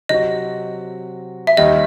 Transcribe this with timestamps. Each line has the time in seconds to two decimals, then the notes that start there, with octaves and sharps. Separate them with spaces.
0.09 C3 F#3 C4 F#4 D#5
1.47 E5
1.57 D#2 D#3 G3 D#4 D#5